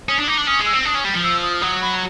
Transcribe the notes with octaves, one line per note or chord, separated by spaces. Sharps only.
C#4 D#6
D4
D#4 D6
D4
C#4 D#6
G#3
E6
C4
D4 D#6
C#4
G3
F3
E6
D#6
F#3 D#6
B5